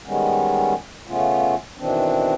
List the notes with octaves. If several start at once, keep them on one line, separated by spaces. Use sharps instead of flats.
D#3 G3 G#3 B3 C#4
C#3 A3 B3 C#4 F4
B2 D#3 E3 C4 D4